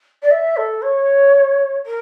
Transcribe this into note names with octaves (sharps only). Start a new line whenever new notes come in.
D5
E5
A4
C#5
A#4